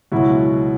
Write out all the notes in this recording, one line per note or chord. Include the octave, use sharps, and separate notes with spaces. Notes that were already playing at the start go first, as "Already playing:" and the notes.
C#2 B2 F#3 E4 F#4